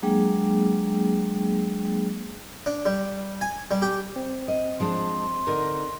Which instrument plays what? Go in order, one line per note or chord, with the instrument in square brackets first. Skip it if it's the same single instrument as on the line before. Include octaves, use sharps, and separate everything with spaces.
[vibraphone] F#3 G#3 A#3 D4 G#4 G5
[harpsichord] D4
G3
G#5
G3
G4
[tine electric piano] C4
[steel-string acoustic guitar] D#5
[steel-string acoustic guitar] F3 G#3 D4 [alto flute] C6
[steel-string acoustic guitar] D3 D#4 A#4